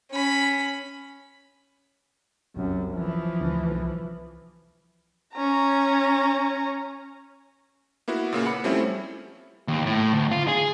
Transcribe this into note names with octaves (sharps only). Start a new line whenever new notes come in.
C#4 B5
F#1 C2 F#2
E3 F3
D2
C2
C#4 A#5
A#3 B3 E4 F#4
A#2 C#3 A#3
F#5 B5 C#7
F3 G3 A3 C4 C#4 E4
D#2
A2
D2
F4
G#4